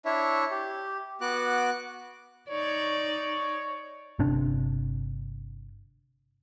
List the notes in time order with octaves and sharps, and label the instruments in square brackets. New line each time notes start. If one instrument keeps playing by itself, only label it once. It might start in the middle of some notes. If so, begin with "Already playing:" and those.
[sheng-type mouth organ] D4 E4 C#5 E5
G4
B3 F#4 D6 F#6
[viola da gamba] D#4 D5 [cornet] C#5
[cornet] C#5
[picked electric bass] G1 C3 D4